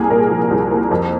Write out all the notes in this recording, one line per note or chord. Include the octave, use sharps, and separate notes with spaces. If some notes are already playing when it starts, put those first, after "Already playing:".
Already playing: C2 A#3 G#4
A#2 A#4
F3
C2
A#3
F2